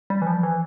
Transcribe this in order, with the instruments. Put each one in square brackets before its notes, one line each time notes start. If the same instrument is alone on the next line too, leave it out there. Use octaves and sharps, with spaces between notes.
[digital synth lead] G3
E3
F3
E3